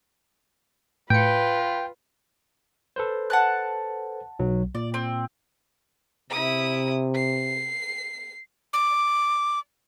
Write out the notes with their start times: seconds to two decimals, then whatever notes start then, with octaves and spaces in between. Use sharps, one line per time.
1.10 A2 F4 B4 G5 C#7
2.96 A4 B4 C5
3.30 F#5 A5 F#6
4.39 B1 F#3
4.75 A#2 D5
4.94 C4
6.30 C3 E4 D#6
7.15 C7
8.73 D6